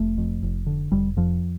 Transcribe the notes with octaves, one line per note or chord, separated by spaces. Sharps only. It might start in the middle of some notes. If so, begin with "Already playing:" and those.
Already playing: F1 A3
F2
F1
D3
F1 G3
F2 F3